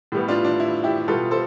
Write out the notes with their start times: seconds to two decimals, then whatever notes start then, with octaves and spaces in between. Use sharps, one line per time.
0.12 A2 G3 B3
0.28 D4 F4
0.45 D4
0.60 E4
0.84 E4 G4
1.08 B2 G3 B3 F4 A4
1.31 A4 C5